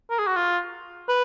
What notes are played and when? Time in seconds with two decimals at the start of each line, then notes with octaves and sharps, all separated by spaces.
0.11 A#4
0.19 G#4
0.27 F#4
0.36 F4
1.09 B4